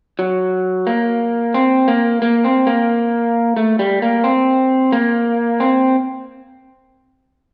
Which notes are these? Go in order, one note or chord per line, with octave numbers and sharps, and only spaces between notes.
F#3
A#3
C4
A#3
A#3
C4
A#3
A3
G3
A#3
C4
A#3
C4